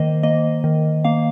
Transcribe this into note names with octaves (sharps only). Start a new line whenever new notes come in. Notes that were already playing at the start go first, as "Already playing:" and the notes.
Already playing: D#3 A#3 C5 D#5
A#3 D#5
D#3
A#3 F5